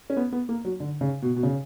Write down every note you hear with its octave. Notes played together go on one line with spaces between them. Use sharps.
C#4
B3
B3
A#3
F#3
D3
C#3
B2
B2
C#3